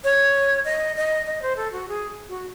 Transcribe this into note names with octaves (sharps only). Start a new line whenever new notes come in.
C#5
D#5
D#5
D#5
C5
A4
F#4
G#4
F#4